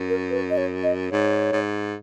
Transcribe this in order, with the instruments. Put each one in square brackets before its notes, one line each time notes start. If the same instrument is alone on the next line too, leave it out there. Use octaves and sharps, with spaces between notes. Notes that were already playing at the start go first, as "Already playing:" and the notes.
Already playing: [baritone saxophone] F#2
[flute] A#4
B4
D#5
C#5
D#5
[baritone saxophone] G#2 [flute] C#5
[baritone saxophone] G#2